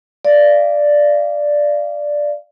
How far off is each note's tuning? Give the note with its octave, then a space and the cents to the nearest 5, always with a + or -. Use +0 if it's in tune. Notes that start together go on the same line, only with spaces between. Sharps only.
D5 +0 F5 -30